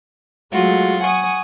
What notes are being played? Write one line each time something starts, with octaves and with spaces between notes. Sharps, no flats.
F#3 G#3 A3 F4 F#4
F#5 G#5 C#6 D#6